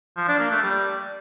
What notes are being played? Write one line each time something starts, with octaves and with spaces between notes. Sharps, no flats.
F3
D4
A#3
A3
G3